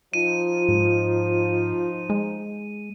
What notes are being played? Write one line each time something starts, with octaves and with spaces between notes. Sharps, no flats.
F3 D#4 F4 D#7
G#2
G#3